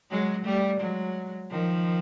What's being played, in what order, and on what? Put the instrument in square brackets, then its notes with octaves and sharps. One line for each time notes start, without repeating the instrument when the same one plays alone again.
[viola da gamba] F#3 G#3
G3 A3
F#3 G#3
D#3 F3